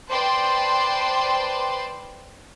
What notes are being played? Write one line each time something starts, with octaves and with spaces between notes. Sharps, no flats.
B4 C5 D5 G5 A5 C6